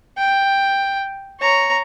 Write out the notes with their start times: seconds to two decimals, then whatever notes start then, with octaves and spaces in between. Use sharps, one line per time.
0.18 G5
1.40 C#5 A#5